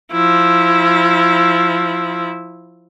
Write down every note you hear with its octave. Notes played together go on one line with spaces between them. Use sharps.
F3 E4